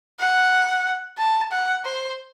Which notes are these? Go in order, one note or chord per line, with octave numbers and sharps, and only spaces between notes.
F#5
A5
F#5
C5